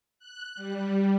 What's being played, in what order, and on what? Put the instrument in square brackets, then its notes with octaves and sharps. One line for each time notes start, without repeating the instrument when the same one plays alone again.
[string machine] F#6
G3